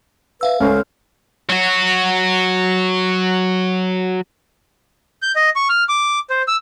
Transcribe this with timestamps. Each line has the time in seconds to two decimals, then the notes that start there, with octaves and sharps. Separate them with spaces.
0.41 B4 E5 F5 E6
0.60 C#2 C#4 A4 C5
1.49 F#3 F#4
5.22 G6
5.36 D#5
5.56 C#6
5.69 F6
5.89 D6
6.30 C5
6.48 E6